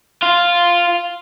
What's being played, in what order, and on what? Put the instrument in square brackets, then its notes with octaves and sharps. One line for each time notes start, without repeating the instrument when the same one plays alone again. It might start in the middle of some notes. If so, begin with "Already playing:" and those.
[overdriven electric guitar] F4